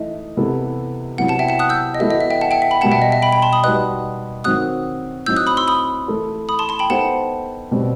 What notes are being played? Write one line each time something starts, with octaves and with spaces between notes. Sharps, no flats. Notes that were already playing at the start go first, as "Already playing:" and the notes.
Already playing: E3 A3 D#4 D#5 E5
C3 E3 B3 E4 A4
C3 F#3 B3 E4 F#5
F#5 A5
E5 G5
F#5 A5
D#6 F#6
E6 G6
D#5
E3 B3 F#4 A4 E5
D#5
E5
E5 G5
F#5 A5
E5 G5
E5
G5 B5
B2 G3 B3 F#4 F#5 A5
E5 G5
D#5
E5
G5 B5
G5 B5
A5 C6
B5 D#6
G3 D#4 F#4 B4 D#5 D#6 F#6
D#3 F#3 C4 F#4 D#6 F#6
A2 F#3 C4 D#4 E6 G6
D#6 F#6
B5 D#6
C6 E6
B5 D#6
E3 A3 E4 A4
B5 D#6
A5 C6
A5 C6
G5 B5
B3 D#4 A4 C5 F#5 A5
B2 G3 C4